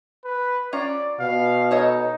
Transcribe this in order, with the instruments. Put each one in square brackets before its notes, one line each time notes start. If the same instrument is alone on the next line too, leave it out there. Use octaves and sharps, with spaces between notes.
[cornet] B4
[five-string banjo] C#4 F4 A#5 [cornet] D5
[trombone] B2 [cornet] F5
[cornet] D#4 [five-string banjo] A4 C#5 D#5